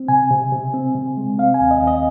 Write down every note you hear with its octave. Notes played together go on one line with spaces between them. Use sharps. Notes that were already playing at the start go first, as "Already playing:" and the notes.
Already playing: C4
C3 G#5
C3
C3
C4
C3
G#3
C4 F5
G#5
D#2
D#5
D#2
D#5